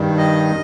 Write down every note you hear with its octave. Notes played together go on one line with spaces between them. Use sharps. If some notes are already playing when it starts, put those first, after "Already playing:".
Already playing: G2 D#3 G3
D#5